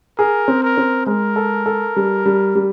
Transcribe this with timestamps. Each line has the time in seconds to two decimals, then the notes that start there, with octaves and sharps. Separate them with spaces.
0.18 G#4 A#4
0.48 C4
0.63 A#4
0.77 C4
1.06 G#3 A#4
1.36 A4
1.66 A4
1.96 G3
2.26 G3
2.55 G3